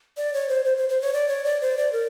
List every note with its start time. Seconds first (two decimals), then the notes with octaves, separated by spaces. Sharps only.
0.17 D5
0.34 C#5
0.49 C5
0.65 C5
0.77 C5
0.89 C5
1.01 C#5
1.13 D5
1.29 C#5
1.45 D5
1.61 C5
1.78 D5
1.93 A#4